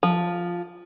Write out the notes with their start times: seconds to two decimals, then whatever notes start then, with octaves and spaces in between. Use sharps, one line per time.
0.03 F3